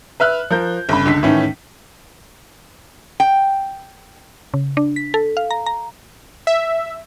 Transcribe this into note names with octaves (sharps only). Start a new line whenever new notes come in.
B4 E5 F6 F#6
F3 A#4 G6
G1 C#3 B5
C#2 D3 B6
A2 D#3 E3 A3 C#4
G5
C#3
D4
B6
A4
F5
A#5
A#5
E5